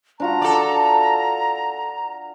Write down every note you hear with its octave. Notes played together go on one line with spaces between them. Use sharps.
D4 F4 F#4 A#5
A4 D5